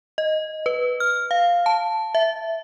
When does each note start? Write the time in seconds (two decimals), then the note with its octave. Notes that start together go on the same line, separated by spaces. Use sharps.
0.18 D#5
0.66 B4
1.00 F6
1.31 F5
1.66 A5
2.15 E5